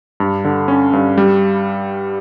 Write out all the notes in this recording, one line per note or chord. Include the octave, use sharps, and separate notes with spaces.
G2
D3
C#4
G2
G3